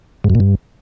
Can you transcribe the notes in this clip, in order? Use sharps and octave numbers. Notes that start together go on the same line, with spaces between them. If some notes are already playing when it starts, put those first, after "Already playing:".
G#2
F#2
A#2
G2